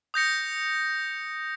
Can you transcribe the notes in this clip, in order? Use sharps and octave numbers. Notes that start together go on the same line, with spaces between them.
D#6 G6 A#6 C#7